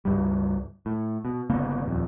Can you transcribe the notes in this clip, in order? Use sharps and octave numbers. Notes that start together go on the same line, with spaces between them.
C#2 G2 G3
A2
B2
G1 C#3 A#3 B3
D#1 F2